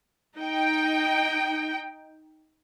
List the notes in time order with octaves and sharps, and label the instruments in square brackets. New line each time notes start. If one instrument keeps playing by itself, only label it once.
[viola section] D#4 G5